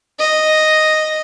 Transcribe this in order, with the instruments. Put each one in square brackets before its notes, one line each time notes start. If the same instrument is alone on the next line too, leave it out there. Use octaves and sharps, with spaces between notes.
[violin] D#5